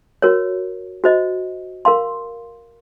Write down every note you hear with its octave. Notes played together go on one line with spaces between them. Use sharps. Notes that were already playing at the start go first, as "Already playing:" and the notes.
F#4 A#4 C#5
F#4 C5 D#5
A#4 F5 C6